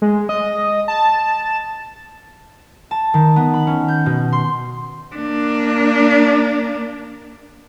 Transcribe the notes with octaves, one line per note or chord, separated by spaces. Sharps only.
G#3
D#5
A5
A5
D#3
B3
B5
C#4
G6
B2
C6
A#3 D4